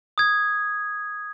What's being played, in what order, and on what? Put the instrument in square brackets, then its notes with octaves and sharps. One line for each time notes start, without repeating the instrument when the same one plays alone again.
[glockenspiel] D#6 G#6